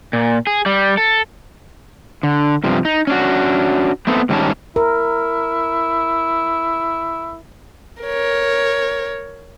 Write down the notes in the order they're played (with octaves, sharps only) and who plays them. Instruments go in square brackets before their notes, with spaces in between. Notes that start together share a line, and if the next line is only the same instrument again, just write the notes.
[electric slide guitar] A#2
G#4
G3
A4
D3
G2 C3 F3
D#4
C#4 D4 F#4
A3 B3 C4 A4
G#2 D#3 G3 C#4 A5
[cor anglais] E4 [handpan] A#4
[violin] A#4 C#5